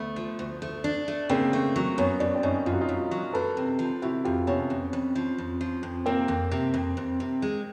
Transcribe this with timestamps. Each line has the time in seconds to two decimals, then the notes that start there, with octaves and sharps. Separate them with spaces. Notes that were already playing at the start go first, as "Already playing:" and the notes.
Already playing: D2 A3 B3
0.16 F3
0.39 D2
0.62 A3
0.84 D4
1.08 A3
1.29 C#3 A#3 C4
1.53 A3
1.76 F#3
1.98 F#2 B3 C#4
2.20 F#2 D4
2.28 C#4
2.35 C4 D4
2.43 F#2 C#4 D#4
2.66 F#2 F4
2.73 F#4
2.81 D#4 F4
2.89 F#2
3.11 F#3
3.33 A#3 A4 B4
3.57 C3
3.79 F3
4.02 C3 E4 F#4
4.25 F2 F4 G4
4.47 C3 B3 C#4
4.70 F2
4.93 F2
5.15 F3
5.38 F2
5.61 F3
5.83 F2
6.06 C3 A#3 C4
6.28 F2
6.51 C3
6.74 F2
6.97 F2
7.20 C3
7.42 G#3